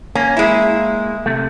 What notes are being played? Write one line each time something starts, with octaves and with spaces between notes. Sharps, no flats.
A#3 C#4
G#3 E4
C3 A3